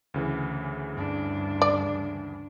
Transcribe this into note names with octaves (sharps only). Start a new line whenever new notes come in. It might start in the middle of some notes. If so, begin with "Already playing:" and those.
D2 C#3 E3
G2 D4
D5